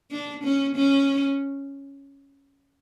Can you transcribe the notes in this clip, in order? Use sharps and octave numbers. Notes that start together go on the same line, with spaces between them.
D4
C#4
C#4